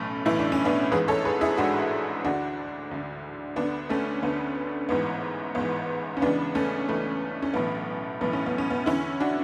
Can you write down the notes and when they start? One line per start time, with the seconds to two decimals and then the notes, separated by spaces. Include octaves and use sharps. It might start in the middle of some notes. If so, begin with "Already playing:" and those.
Already playing: B1 A2 E3 A3 C#4
0.25 B1 A2 E3 E4
0.39 D4
0.52 C#4
0.65 B3 D4
0.91 A1 G#2 E3 G#4 B4
1.08 A4 C#5
1.25 G#4 B4
1.41 E4 G#4
1.57 A1 G#2 E3 D4 F#4
2.25 D2 D3 D4 F#4
2.91 D2 D3
3.56 D2 D3 B3 D4
3.90 A3 C#4
4.23 D2 D3 B3
4.89 A1 G#2 E3 B3
5.55 A1 G#2 E3 B3
6.17 C#4
6.21 C#2 C#3 E3 B3 D4
6.55 A3 C#4
6.88 C#2 C#3 E3 A3
7.42 C#4
7.54 B1 A2 E3 B3
8.21 B1 A2 E3 B3
8.33 C#4
8.46 B3
8.58 C#4
8.71 B3
8.86 E2 D3 C#4 E4
9.20 D4 F#4